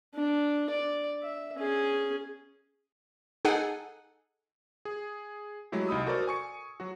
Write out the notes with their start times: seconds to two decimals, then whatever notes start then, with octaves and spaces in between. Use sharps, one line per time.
0.15 D4
0.70 D5
1.23 E5
1.56 C#4 G#4
3.45 D#4 G#4 A4 F#5 G#5
4.85 G#4
5.72 F#3 G#3 A3 E4 G4
5.87 C2 D#4 B5 D#6 E6
6.07 F#4 A4 A#4 C5 D5
6.27 G#5 C#6 C#7
6.80 F#3 F#4